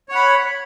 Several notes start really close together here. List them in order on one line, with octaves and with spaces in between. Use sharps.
C#5 F#5 B5